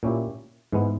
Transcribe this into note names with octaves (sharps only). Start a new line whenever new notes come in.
A#2 A#3 C#4 E4 G4
G#2 E3 G#3 B3